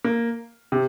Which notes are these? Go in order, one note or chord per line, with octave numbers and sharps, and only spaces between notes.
A#3
C3